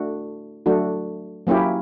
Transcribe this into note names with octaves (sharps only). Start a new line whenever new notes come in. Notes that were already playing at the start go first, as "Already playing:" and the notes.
Already playing: A3 D4 F#4
F#3 A3 D4 F#4
F#3 A#3 C#4 E4 G4